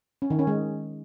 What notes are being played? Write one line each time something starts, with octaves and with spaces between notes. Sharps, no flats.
C#4
D#3
C#4
G#3